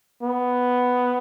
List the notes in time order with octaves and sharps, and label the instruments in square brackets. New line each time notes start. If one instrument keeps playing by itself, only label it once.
[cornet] B3